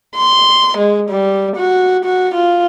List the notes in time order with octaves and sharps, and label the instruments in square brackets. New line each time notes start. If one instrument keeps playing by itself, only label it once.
[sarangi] C6
G#3
G3
F#4
F#4
F4